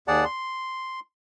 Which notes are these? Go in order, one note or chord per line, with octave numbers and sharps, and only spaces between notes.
D#2 G#4 D5 F#5 A5
C6